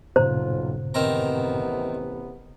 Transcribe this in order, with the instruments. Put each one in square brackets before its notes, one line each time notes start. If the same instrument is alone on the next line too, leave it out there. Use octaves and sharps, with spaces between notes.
[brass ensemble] B1 F4 [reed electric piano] G2 A#2 C#3 [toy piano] C5
[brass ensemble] A1 C3 B3 [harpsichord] D#3 C4 A#5